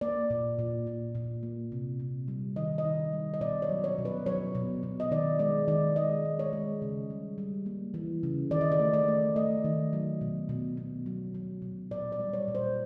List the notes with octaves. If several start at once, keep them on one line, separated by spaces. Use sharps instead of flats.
A#3 D5
A#2
A#2
A#2
A#2
A#3
C3
C3
G3
D#3 D#5
D#5
D#3
G3
D#5
B2 D5
C#5
F#3
C#5
B2
B4
F#3 C#5
B2
B2
D#5
D#3 D5
G#3 D5
D#3 D5
G#3 D#5
G#3
C#5
G#3
C#3
G3
G3
A#3
E3
C#3
D#3 D5
D#5
D5
A3
D5
A3
A3 D#5
D#3
F#3
B2
B2
B2
F#3
F#3
B2
A#2 D5
D5
G3
C#5
A#2
C5